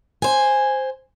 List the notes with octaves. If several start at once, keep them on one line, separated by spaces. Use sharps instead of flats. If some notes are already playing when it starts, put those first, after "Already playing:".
C5 G#5